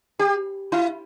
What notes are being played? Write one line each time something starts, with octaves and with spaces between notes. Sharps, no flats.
G4
E4